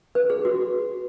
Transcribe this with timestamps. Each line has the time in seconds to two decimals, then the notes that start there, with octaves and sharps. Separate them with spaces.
0.15 B4
0.30 G#4
0.45 F#4